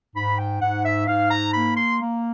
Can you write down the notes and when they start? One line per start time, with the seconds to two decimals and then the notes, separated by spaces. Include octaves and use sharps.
0.14 G#2 B5
0.38 G5
0.61 G#2 F#5
0.84 E5
1.07 G#2 F5
1.31 A#5
1.53 A#3 B5
1.76 C6
1.99 A#3